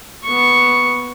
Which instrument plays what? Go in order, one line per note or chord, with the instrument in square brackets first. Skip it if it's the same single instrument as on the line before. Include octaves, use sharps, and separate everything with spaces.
[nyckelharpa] B3 C#6